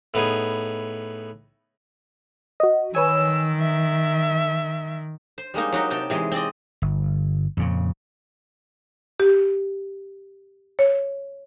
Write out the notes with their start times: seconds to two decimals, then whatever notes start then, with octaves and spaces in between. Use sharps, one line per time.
0.14 A2 B3 D#4 G#4
2.60 F#4 D#5
2.95 D#3 B4 C#5 G#5 E6
3.60 E5
5.38 C5
5.54 G3 G#3 A#3 D#4
5.72 F#3 D#4 F#4 G4
5.90 C3 D#4 G5 A5
6.10 C3 E3 G#3 G#4 C6
6.32 C4 D5 D#5
6.82 G1
7.57 F2 A#2 C#3
9.20 G4
10.79 C#5